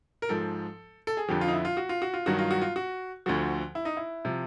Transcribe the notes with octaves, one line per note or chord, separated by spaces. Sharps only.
A#4
G#2 F3 A4
A4
G#4
F2 D3 F3 G4
F4
D#4
E4
F4
F#4
F4
F#4
F4
G2 D#3 F#3 F#4
F4
F#4
F4
F#4
D2 D3 F3 F#4
E4
D#4
E4
C3 F3